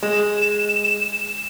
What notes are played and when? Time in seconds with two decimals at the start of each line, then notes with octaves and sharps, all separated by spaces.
0.03 G#3 E7